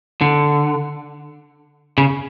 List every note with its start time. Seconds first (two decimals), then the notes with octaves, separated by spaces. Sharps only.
0.21 D3
1.98 C#3